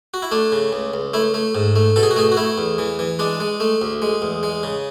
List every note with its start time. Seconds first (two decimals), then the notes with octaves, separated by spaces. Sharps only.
0.14 F#4
0.22 E4
0.31 A3 D4
0.52 C#3
0.73 C#2
0.94 C#2
1.14 A3 E4
1.34 A3
1.55 G#2
1.76 A3
1.96 B2 A4
2.03 G#4
2.11 F#4
2.16 A3 G#4
2.32 F#4
2.37 A3 E4
2.58 E2
2.78 E3
2.99 E3
3.19 G#3 D4
3.40 G#3
3.60 A3
3.82 D2
4.02 G#3
4.22 E2
4.43 G#3
4.63 C#3